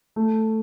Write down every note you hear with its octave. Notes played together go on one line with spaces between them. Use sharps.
A3